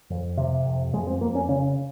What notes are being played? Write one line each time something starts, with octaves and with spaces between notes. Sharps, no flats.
F2
C3
F2
F2 G#3
C4
F2 A#3
C#4
C#3 C#4